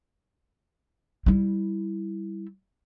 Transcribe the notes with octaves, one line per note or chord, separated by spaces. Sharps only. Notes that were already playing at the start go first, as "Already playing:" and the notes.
G3 E4